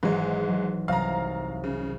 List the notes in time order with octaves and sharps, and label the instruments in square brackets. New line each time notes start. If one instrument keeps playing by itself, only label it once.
[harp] G#1 E3 F#3 [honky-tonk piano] G#2 G#3
[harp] F#3
[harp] C2 F#3 D#4 [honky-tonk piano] F5 A#5
[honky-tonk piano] C#3